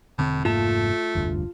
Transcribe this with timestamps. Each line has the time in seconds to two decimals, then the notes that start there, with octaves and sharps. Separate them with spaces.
0.19 E1 A2 D3 C4
0.45 F1 G#2 A3 A#3 F4 A5
1.15 F1 D2 G2